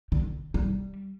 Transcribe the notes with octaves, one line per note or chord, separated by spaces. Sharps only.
D3
G3